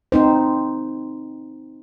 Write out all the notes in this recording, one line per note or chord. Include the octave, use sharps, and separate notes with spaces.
C4 D#4 C5